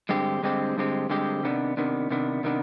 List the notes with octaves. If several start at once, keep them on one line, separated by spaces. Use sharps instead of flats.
G2 D3 G#3 C4 G4
G2 D3 G#3 C4 G4
G2 D3 G#3 C4 G4
G2 D3 G#3 C4 G4
C3 D#3 B3 D4
C3 D#3 B3 D4
C3 D#3 B3 D4
C3 D#3 B3 D4